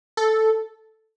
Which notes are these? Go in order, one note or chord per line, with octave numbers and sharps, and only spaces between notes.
A4